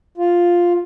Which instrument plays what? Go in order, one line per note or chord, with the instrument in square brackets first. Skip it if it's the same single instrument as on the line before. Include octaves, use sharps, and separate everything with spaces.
[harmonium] F4